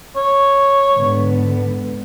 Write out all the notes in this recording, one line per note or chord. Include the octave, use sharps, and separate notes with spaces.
C#5
G#2 D3 B3